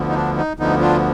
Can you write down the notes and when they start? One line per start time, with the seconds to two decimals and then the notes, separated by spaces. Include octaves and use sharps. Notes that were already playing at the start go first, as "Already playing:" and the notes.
Already playing: D2 D3 F3 B3
0.09 D#4
0.15 D4
0.37 D#4
0.59 D2 D3 F3 B3 D#4
0.81 D4 F4